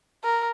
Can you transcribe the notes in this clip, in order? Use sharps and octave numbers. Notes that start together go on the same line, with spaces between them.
A#4